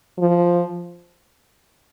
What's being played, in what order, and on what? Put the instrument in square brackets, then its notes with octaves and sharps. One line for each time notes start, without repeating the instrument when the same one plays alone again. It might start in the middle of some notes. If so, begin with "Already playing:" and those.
[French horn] F3